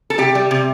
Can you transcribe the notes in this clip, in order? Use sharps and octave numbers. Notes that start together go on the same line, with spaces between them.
A4
C3 G4
G3
C3